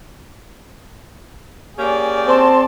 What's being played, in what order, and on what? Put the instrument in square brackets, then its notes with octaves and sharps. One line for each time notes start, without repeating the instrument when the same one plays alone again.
[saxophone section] A#3 C#4 G4 [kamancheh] G#4 D5
[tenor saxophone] C4 [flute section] A5 C6